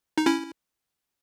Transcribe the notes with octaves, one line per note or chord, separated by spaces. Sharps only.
D#4
C#4 E4